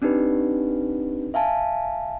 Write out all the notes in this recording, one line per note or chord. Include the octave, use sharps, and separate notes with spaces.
C4 D4 D#4 G4 B4
E5 F5 G#5 A5